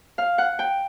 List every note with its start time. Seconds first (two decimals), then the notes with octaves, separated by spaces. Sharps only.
0.18 F5
0.38 F#5
0.59 G5